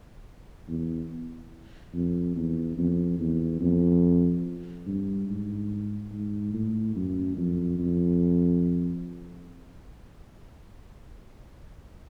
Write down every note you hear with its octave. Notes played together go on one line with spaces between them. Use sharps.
E2
F2
E2
F2
E2
F2
G2
G#2
G#2
A2
F#2
F2
F2